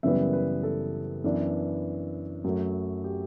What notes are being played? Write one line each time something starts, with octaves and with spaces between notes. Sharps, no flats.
F#1 F#2 E3 G3 B3 E5
B4
A4
F#2 E3 B3 D4
F#2 F#3 A3
G4